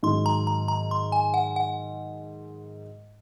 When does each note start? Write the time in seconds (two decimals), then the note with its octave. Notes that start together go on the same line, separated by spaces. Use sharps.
0.03 G#2 D#3 F#3 C6
0.26 A#5
0.47 A#5
0.68 A#5
0.91 C6
1.12 G#5
1.34 F#5
1.56 F#5